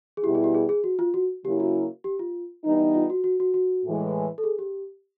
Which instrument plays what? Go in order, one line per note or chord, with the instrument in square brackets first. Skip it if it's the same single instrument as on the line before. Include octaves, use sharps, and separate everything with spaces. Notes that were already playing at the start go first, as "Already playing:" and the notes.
[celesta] G#4
[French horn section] B2 G3 B3 E4 [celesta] G4
[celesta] G#4
G4
G#4
G#4
F#4
F4
F#4
[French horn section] C#3 F#3 A#3 C#4 E4 [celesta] G4
[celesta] F#4
G4
F4
[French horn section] E3 G3 B3 D#4
[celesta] F4
F#4
F#4
F#4
F#4
[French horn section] A2 E3 G#3
[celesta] A4
G#4
G4